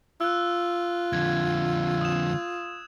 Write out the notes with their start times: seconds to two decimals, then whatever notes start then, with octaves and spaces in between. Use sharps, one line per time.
0.21 F4 E6 F#6
1.13 F2 D3 G#6
2.01 D#6 E7